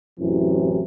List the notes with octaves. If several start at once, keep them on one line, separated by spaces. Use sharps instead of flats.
A1 F#2 C3 E3